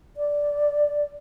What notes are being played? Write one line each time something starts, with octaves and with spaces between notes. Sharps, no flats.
D5